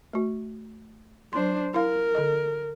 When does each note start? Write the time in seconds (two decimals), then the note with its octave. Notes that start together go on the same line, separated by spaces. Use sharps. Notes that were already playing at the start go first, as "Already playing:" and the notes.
0.13 A3 F#4
1.33 F#3 D4 C5 C6
1.74 E4 A#4 F5
2.15 D3 A4 D#5